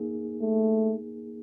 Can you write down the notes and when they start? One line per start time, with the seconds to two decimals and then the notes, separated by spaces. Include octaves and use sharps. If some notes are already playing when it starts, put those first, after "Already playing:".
Already playing: A#3 D#4 G#4
0.42 A3